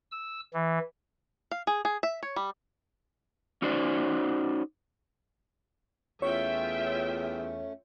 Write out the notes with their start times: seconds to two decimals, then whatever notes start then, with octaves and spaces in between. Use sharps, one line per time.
0.11 E6
0.54 E3
1.51 F5
1.67 G#4
1.85 G#4
2.03 E5
2.23 C#5
2.36 G3
3.62 C#4 D#4 F#4 C5 D5
6.22 E2 A3 C#4 F4 C#5 E5 G5